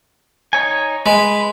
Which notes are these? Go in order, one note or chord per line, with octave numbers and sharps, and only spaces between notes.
D#4 C#5 G#5
G#3 B4